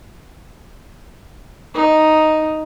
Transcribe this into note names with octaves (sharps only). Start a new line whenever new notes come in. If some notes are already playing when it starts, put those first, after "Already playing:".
D#4